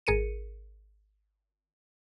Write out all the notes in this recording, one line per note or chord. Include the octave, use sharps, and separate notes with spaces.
G#1 G#4 A#4 C#7 D#7